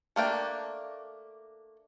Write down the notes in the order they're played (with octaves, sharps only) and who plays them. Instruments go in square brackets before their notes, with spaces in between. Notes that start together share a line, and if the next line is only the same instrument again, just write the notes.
[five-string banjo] A3 A#3 D4 G5